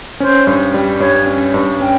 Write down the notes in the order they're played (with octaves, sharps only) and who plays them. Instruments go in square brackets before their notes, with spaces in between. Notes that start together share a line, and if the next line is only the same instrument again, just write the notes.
[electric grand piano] C#4 [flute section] C5
[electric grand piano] G2
G3
[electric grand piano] G2 [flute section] C#5
[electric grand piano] C#4
G2
[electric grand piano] C#4 [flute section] G5